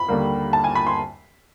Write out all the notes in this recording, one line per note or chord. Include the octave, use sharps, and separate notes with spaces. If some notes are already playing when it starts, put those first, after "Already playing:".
Already playing: B5
D#2 D3 G3 A#3
A5
G#5
B5
C6